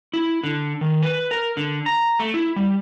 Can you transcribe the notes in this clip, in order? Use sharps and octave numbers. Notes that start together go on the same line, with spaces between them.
E4
D3
D#3
B4
A#4
D3
A#5
A3
E4
G3